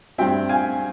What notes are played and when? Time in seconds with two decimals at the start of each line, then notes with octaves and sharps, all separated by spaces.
0.18 G2 G3 C4 E5 G5
0.49 F5 G#5